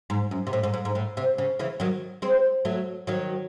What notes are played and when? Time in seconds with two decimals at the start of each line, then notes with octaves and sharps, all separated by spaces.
0.10 G#2
0.31 F#2
0.47 C3
0.53 A2
0.63 G#2
0.74 G#2
0.85 G#2
0.95 A2
1.17 C3
1.38 C#3
1.59 C#3 E3
1.80 D#3 F#3
2.22 G#3 C4
2.65 F#3 A3
3.07 D#3 F#3